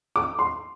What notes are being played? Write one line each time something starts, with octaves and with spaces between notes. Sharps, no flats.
D6
C6